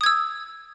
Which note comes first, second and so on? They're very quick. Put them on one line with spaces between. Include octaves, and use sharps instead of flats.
D#6 G#6 E6